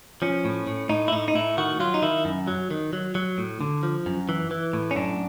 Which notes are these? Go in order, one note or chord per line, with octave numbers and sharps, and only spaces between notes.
F3 C#4
A2
A2
A2 D#4
E4
A2 D#4
D#4
A2 E4
D#3 F#4
F#3 F4
D#4
D#3 E4
F#2
F#3
D#3
F#3
F#3
A2
D3
F3
F#2
E3
E3
A2
C#4
F#2 D4